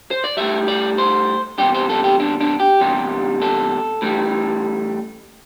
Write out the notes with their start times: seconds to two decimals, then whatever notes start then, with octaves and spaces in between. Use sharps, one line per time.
0.11 C5
0.24 D5
0.37 A2 G3 E5
0.68 D5
0.98 C5
1.58 E2 C3 G3 G4
1.75 C5
1.89 A4
2.04 G4
2.20 D4
2.41 D4
2.60 G4
2.81 E2 C3 G3
3.42 A4
4.02 A2 E3 G3